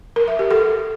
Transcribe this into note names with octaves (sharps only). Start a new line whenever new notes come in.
A#4
E5
G4
A4